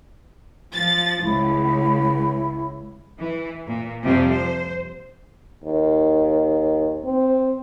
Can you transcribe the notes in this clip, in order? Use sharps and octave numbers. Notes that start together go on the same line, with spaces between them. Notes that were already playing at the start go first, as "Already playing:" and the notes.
F3 A6
C#2 E4
E3
A#2
F2 C3 F3 G3 C4
C5
D#2
C4